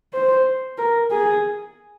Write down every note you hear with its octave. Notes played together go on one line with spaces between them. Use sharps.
C5
A#4
G#4